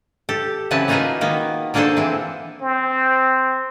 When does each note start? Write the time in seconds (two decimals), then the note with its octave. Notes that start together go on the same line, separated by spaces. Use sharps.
0.29 G4 A4
0.71 C#3 E3 F#3 C4 B4 A5
0.88 A#3 D#4 F4 F#4 G#4 B4
1.21 D#3 A#3 B3
1.74 D3 A#3 D4 G#4 A4 C5
1.97 E3 C4
2.61 C4